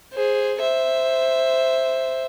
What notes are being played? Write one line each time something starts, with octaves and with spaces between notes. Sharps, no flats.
G#4 C5
C5 E5